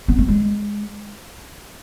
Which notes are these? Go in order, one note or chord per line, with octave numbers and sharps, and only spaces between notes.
B3
A3
G#3